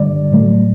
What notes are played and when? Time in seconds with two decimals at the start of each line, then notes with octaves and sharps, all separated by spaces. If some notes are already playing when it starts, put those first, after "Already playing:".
Already playing: G2 D3 G3 D5
0.31 A2 F#3 A3